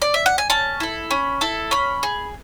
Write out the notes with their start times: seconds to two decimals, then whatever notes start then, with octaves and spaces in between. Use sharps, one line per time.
0.02 D5
0.14 E5
0.26 F#5
0.38 G#5
0.50 C#4 A5
0.80 E4 A4
1.11 C#4 B5
1.41 E4 A4 A5
1.71 C#4 B5
2.03 G#4